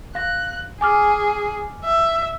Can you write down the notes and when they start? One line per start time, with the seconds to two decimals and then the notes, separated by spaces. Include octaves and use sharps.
0.15 F5 F#6 A#6
0.81 G#4 G#5 D6 F6
1.84 E5